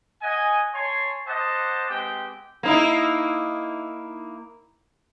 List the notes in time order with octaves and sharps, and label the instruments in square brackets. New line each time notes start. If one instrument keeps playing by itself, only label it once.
[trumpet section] D#5 F#5 G#5
C#5 G#5 A5 C6 C#6
C5 D#5 F#5 A5 D6
G#3 B3 C4 G4 G5
[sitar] A#3 D#4 E4